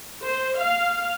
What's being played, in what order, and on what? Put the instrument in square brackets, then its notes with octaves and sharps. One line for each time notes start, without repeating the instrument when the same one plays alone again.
[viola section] C5
F5